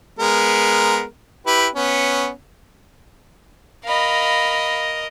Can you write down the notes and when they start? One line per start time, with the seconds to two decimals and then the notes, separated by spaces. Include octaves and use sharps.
0.19 G#3 B3 A#4
1.46 E4 G4 B4
1.75 B3 C#4
3.85 A#4 D#5 F5 B5